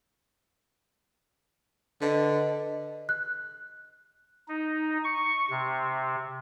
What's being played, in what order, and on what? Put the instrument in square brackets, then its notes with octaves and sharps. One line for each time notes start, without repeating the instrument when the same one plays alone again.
[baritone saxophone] D3 [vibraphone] B4 D#5 A5
[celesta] F#6
[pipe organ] D#4
C#6
C3